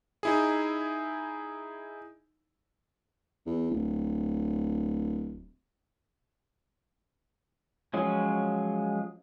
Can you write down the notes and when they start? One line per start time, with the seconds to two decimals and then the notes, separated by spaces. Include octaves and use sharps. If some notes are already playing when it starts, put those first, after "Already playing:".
0.23 D#4 E4 G#4
3.46 E2
3.71 D1
7.94 F3 F#3 G#3 C#4